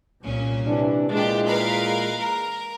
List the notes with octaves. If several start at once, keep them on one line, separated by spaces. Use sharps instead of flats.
C2 A#2 C#4
C3 E3 D4
A#2 E3 G#3 D4 G4
A#4 B4 F5
A#4